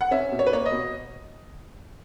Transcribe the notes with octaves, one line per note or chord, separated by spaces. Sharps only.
F#5
C#4 E5
B2
C#5
B4
A#3 C#5
D#5
B2